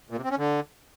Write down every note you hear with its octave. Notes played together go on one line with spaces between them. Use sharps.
A#2
C3
C4
C#4
D3